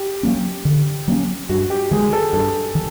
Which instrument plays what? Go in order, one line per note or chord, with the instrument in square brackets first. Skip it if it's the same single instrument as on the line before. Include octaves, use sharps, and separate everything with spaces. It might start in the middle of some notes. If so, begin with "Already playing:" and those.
Already playing: [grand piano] G4
[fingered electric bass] F#3 A#3 C#4
D3
F#3 A#3 C#4
[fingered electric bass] G2 [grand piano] F#4
[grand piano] G4
[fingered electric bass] D#3 G#3 [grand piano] G#4
[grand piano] A4
[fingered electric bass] G2 [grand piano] A4
[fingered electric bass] D#3